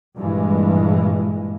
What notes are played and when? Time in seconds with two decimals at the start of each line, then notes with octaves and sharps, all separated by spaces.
0.17 G2 A#2 E3 G#3